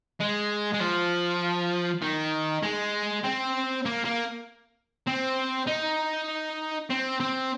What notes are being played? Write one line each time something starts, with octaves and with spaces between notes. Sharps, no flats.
G#3
G#3
F3
D#3
G#3
C4
A#3
A#3
C4
D#4
C4
C4